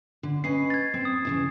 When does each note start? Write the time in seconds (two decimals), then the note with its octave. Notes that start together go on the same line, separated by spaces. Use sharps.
0.23 D3
0.44 C#4 B4 D#5 C7
0.70 G#6 A6
0.94 C4
1.05 D#6
1.25 E2 C#3 E4